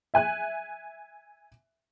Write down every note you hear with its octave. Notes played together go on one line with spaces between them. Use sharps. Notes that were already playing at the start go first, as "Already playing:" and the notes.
E5 G#5 F#6